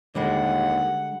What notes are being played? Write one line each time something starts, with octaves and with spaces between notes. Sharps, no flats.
D#2 D3 G3 G#3 F#5